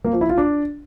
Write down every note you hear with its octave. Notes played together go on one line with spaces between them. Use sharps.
A#3
F3
E4
F4
D4